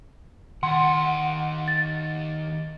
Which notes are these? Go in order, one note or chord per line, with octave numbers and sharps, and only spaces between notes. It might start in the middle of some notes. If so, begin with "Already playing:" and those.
D#2 F#5 C6
A6